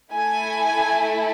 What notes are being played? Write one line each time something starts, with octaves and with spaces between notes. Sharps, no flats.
A3 E4 A4 G#5